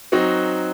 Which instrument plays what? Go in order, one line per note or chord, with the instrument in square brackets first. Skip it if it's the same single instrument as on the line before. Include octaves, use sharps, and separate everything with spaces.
[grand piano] F#3 C4 D#4 F#4